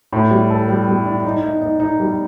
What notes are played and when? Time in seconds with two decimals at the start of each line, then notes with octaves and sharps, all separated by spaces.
0.13 A2
0.31 G3
0.50 A4
0.69 G3
0.88 G3
1.06 D4
1.25 D#4
1.43 D#4
1.62 D#4
1.80 D#4
2.00 G3